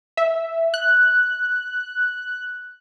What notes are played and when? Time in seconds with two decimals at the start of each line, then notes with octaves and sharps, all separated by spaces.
0.17 E5
0.74 F#6